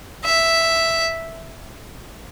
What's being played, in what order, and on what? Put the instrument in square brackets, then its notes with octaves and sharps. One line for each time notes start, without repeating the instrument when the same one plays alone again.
[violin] E5